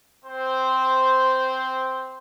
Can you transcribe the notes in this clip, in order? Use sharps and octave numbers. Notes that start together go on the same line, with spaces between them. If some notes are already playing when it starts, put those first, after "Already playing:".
C4 C5